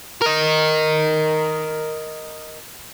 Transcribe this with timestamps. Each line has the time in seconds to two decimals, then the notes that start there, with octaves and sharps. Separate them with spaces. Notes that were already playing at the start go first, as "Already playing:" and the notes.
0.22 A#4 D#5